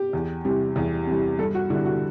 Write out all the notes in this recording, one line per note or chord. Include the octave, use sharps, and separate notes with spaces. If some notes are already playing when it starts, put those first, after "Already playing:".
Already playing: G4
E2
C3 E3 G3
E2
C3 E3 G3
G2 A4
F#4
D3 G3 E4
F#4